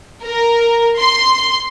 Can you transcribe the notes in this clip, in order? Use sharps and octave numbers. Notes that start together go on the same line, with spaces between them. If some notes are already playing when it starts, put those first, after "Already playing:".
A#4
C6